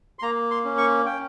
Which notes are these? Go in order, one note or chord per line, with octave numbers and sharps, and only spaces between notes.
C6
A#3 A#5
C6
C#4
C#6
C#4 G5